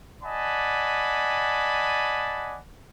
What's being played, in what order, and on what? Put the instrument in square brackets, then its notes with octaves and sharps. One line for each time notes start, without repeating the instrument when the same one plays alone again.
[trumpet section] D5 D#5 F#5 G#5 A5 B5